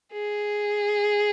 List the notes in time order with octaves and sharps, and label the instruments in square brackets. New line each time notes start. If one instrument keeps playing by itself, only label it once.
[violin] G#4